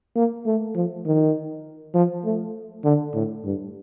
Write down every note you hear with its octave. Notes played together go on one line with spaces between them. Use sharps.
A#3
A3
F3
D#3
F3
A3
D3
A2
G2